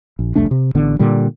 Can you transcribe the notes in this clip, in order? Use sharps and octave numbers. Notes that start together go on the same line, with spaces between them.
A#1
F1 C2 A3 D4
C3
A1 D3 B3
A#2 D3 G3